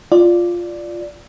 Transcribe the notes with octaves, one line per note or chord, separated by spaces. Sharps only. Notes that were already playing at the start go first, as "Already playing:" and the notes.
F4 D5